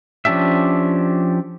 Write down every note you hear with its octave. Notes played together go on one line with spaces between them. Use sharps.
F3 C#4 D4 G4 E5